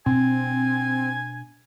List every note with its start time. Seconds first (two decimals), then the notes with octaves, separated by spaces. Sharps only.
0.06 B2 C4 D4 G#5